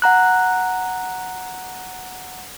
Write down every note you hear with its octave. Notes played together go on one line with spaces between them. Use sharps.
F#5 A#5 F#6